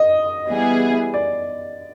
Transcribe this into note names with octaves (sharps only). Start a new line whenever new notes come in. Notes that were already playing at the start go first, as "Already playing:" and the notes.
Already playing: D#5
E3 G3 B3 E4 G#4
D5